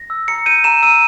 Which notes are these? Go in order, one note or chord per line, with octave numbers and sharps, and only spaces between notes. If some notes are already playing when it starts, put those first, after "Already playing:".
Already playing: A#6
E6
A#5 C#7
G6 D#7
A#5 E7
E6 D#7